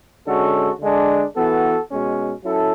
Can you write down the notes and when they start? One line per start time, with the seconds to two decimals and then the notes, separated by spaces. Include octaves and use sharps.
0.26 D3 G#3 C#4 F#4 A4
0.80 D3 G#3 D4
1.35 E3 B3 F#4 A4
1.90 B2 G#3 C#4
2.43 F#3 C#4 E4 A4